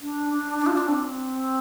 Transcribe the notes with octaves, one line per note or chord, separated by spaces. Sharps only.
D4
D4
D4
F4
D4
C4